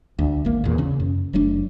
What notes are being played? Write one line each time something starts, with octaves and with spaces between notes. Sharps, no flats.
D2
G#1 A#3
E2 A#2
C#3 C#4
F#2
F#1 F#3 A3 D4